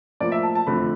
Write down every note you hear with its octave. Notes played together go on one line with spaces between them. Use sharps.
A2 F3 A#3 D5
E5
A5
A5
F2 D3 F3 A3 B5